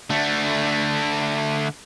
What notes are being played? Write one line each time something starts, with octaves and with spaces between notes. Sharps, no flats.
D3 A3